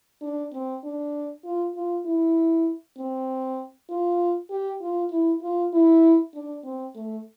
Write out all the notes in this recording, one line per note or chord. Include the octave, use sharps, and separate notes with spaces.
D4
C4
D4
F4
F4
E4
C4
F4
G4
F4
E4
F4
E4
D4
C4
A3